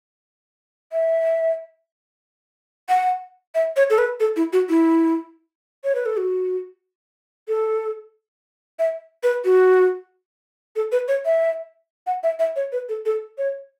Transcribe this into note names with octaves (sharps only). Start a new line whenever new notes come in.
E5
F#5
E5
C#5
A4
B4
A4
E4
F#4
E4
C#5
B4
A4
F#4
A4
E5
B4
F#4
A4
B4
C#5
E5
F#5
E5
E5
C#5
B4
A4
A4
C#5